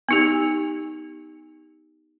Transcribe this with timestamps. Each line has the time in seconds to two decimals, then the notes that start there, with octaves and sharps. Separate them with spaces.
0.09 B3 D#4 G4